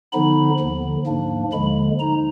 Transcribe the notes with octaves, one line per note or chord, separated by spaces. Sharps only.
D3 F3 B3 D#4 B5
D#2 D3 F3
G#2 F3 A#3 D4
D#2 D3 F3 G#3 B5
D#4 A#5